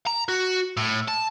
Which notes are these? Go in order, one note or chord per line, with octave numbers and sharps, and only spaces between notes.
A#5
F#4
A2
A5